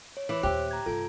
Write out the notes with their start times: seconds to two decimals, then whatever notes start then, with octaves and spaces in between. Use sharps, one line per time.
0.17 C#5
0.29 E3 C#5 D6 E6
0.43 D#2 A#2 G4 C5 E5 F#6
0.71 A#5 G#6
0.86 G2 C3 F4 A4 D7